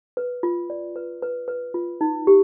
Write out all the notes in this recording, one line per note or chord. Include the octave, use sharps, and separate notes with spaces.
B4
F4
D5
B4
B4
B4
F4
D#4
G4